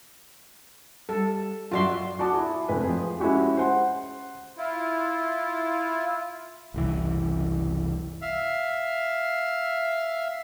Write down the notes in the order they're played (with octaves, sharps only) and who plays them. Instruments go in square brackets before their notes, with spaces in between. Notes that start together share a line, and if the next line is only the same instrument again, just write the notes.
[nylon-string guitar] G3 [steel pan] A4
[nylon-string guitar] F#2 D5 E5 [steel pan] F4 F#4 C6
[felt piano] F#4 D5 A5 D6 D#6
E4 G#4
F1 F2 G#3 B4
F3 G#4
G#3 C#4 E4 F#4 G4
C5 F#5 C6
[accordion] E4 F4
[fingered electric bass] F#1 C2 E3
[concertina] E5 F5